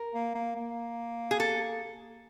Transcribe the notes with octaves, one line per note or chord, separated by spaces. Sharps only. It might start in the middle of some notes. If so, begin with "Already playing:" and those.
Already playing: A#4
A#3
A#3
A#3
G#4
A4